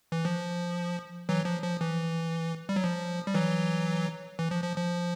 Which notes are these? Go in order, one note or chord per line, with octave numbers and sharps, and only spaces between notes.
E3
F3
E3 F#3
F3
F3
E3
G3
F#3
F3
G3
E3 F#3
E3
F3
F3
F3